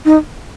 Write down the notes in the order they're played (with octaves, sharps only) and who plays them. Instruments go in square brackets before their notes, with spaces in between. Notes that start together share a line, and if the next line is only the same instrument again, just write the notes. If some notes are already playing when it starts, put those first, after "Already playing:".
[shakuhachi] D#4